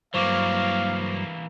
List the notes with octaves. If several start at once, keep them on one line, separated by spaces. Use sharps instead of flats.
G2 E3 F#3 A#3 C5 F5 C#6 D6